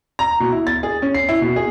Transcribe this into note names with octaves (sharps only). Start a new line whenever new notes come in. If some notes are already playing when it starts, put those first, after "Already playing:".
A#5
B2
E4
A6
G#4
C#4
C7
E4
B2
G#4